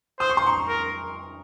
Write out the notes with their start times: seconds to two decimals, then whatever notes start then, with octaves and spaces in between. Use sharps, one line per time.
0.20 C5 D#6
0.30 C#6
0.37 C6
0.46 A#5 C#6
0.68 A#4